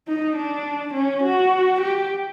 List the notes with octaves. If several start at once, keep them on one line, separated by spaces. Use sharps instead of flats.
D#4
D4
C#4
F#4
G4